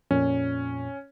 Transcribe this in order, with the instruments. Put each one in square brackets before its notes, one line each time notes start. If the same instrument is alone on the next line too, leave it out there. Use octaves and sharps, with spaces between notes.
[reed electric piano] F2 A#2 [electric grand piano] C#4